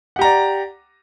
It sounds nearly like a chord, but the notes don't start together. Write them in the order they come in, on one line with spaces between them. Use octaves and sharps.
F#5 G4 A#5 D5